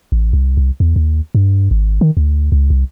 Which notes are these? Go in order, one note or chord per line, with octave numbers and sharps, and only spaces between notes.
A1
C2
C2
E2
D#2
G2
G#1
D#3
D2
C#2
C2